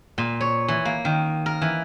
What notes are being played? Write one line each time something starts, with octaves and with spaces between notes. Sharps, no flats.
A#2
C#5
E3
A#3
D#3
A#4
E3